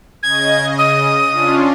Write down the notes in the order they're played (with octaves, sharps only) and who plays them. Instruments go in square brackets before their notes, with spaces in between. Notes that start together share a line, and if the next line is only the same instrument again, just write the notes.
[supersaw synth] C#3 D#5 [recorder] G#6
[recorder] D#6
[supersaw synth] C#4 D4 F4